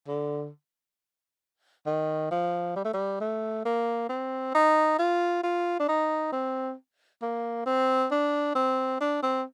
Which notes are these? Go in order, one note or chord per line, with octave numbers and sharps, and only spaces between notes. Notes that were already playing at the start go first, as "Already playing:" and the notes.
D3
D#3
F3
G3
A3
G3
A3
A#3
C4
D#4
F4
F4
D4
D#4
C4
A#3
C4
D4
C4
D4
C4